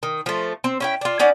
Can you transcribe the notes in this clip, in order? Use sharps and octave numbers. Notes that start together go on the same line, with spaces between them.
D#3
F3 A3
C4
C#4 E4 G5
D4 F4
C#4 D#4 D5 F#5